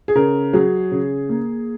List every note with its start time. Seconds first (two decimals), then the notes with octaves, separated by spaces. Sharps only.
0.08 G#4
0.15 C#3 A#4
0.53 F#3 G#4
0.91 C#3
1.29 A#3